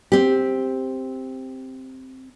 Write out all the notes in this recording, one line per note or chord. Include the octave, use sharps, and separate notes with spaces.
C4 G4